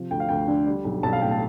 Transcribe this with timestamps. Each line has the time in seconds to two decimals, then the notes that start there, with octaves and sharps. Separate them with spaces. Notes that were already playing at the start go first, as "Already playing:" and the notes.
Already playing: C3 F3
0.11 D2 G5
0.20 F5
0.29 D2 G5
0.48 D3
0.66 G3
0.85 B1
1.03 B1 A5
1.13 F5
1.22 A2 G5
1.31 A5